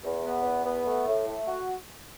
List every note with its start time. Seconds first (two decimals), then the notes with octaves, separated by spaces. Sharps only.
0.04 E2
0.24 B3
0.44 E2
0.65 B3
0.86 A3
1.06 A2
1.27 A3
1.47 F#4